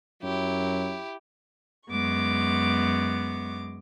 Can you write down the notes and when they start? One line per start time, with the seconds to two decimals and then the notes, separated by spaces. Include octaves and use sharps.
0.23 F#2 F#3 E4 G4
1.90 F#2 G#3 B3 C#6 D6